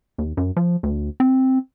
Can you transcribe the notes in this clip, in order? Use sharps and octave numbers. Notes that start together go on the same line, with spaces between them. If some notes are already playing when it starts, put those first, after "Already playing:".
D#2
F#2
F3
D2
C4